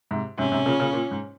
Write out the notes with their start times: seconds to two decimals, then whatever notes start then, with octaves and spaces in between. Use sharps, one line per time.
0.11 G#2 C3
0.38 G#2 C3 C#4
0.52 G#2 C3
0.66 A#2 C#3
0.79 A#2 C#3
0.93 A#2
1.11 G#2